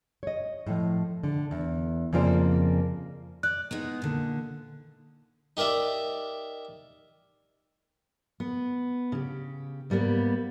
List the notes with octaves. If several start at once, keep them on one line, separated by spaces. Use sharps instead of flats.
C#5 D#5
A2 F3
D3
E2
F2 C#3 A#3 F4 C5 D5
D5 F#6
G#3 B3 D#4
A#2 D3
D#4 G4 A#4 D5 E5
B3
C#3 G4
G#2 G3 A#3 B3